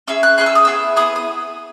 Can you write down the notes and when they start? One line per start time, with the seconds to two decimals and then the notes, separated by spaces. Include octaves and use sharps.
0.08 C#4 E4 G#4 E6
0.23 F#6
0.38 C#4 E4 G#4 F#6
0.46 E6
0.55 D#6
0.65 B3 E4 G#4 E6
0.96 B3 E4 G#4 D#6
1.16 D#6